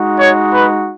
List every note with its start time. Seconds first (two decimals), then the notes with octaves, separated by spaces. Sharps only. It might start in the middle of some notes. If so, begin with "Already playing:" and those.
Already playing: G#3 D#4 F#4
0.18 C#5
0.53 B4